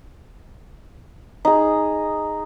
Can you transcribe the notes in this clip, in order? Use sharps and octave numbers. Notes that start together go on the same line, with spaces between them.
D#4 G#4